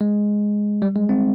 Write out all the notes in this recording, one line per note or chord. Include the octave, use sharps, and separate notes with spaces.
G#3
G3
G#3
C4